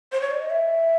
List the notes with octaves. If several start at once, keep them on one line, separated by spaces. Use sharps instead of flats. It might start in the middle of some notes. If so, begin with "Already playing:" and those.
C5
C#5
D5
D#5
E5